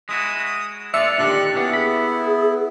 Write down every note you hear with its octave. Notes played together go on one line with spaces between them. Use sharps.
G#3 E4 F#4 D#6
A#2 D4 F4 D5 E5 C#7
A#2 D3 D#3 D4 G4 D5 F#6
B3 C#4 D4 E4
G#4 B5